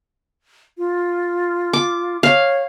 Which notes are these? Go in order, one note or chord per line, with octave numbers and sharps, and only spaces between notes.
F4
D6
C#5 F5